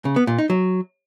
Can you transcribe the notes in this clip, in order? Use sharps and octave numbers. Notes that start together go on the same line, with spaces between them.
C#3
B3
A#2
D#4
F#3